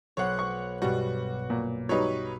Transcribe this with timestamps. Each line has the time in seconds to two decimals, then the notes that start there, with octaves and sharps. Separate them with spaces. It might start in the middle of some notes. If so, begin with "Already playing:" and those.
0.17 B1 C5 C#5 F#5 F#6
0.39 C#6
0.82 G2 B2 G3 F#4
1.50 A#2
1.89 F#3 G3 D#4 B4 C#5